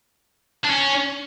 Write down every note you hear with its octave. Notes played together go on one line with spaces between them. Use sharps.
D4
C#4